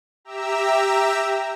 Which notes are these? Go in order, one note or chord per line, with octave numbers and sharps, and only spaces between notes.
G4 E5 A#5 E6